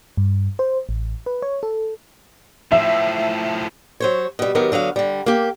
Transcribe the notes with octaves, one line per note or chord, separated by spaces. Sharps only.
G2
C5
A1
B4
C#5
A4
A2 F3 E5
F#3 C5 C#5
B2 G3
D#3 F#3 B3 G4 A#4
D3 F#3 B3 F5
D3 G3
A#3 G4